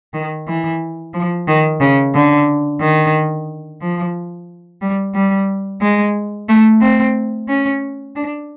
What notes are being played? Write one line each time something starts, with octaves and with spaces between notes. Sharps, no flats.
D#3
E3
F3
D#3
C#3
D3
D#3
F3
G3
G3
G#3
A3
C4
C#4
D4